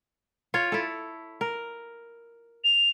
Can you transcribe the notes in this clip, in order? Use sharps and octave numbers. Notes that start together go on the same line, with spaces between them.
F4 C#5
E4 A4
A#4
F7